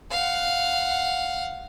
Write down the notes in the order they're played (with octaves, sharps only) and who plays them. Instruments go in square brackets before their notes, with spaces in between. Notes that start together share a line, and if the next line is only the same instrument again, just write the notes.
[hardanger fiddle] F5 F#5